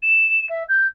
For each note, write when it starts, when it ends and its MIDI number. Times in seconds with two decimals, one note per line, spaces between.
0.02 0.46 100
0.49 0.63 76
0.68 0.86 91